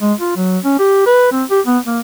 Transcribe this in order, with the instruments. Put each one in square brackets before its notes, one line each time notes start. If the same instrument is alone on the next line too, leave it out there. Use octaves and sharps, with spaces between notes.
[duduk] G#3
F4
F#3
C#4
G4
B4
C4
G4
B3
A#3